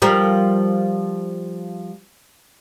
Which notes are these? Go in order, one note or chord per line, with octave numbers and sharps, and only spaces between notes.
F3 G3 A#4